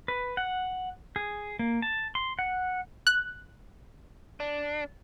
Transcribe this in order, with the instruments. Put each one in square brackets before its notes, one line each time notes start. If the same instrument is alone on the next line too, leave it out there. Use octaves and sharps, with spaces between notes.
[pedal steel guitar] B4
F#5
G#4
A#3
A5
C6
F#5
[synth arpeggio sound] F#6
[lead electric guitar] D4